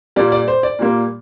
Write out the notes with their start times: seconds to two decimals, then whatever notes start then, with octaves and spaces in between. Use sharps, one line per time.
0.16 A#2 G3 A#3 D5
0.32 D5
0.48 C5
0.63 D5
0.79 A#2 G3 A#3